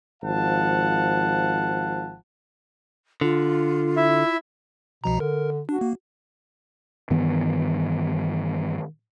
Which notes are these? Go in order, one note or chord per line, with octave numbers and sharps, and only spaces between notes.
G#1 F3 F5 F#5 A5
D3 F4
E4 E5
C2 B2 F3 A#5
D3 A#4
D4 F#4
A#3
G2 D#3 E3 B3